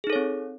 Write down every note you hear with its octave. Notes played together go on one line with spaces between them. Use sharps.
C4 D#4 G#4 A4 C#5